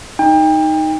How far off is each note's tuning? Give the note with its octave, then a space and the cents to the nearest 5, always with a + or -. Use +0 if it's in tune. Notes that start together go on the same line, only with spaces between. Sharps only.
D#4 +0 G5 +30